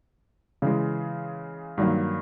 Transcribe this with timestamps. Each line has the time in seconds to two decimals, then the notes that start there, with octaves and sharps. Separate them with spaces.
0.62 C#3 E3 G#3
1.78 G2 D#3 F#3 A#3